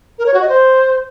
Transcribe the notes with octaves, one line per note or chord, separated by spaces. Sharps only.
A#4
C#5
F#4
D#5
C5